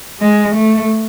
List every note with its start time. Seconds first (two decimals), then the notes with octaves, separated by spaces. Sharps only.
0.21 G#3
0.55 A3